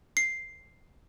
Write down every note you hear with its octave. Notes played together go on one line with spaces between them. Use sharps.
C7